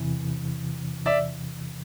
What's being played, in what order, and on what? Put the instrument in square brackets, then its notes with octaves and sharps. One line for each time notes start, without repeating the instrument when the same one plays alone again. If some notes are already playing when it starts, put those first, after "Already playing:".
Already playing: [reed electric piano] E2 C3 E3
[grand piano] D5 E5